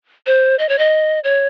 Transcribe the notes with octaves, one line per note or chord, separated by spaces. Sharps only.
C5
D#5
C#5
D#5
C#5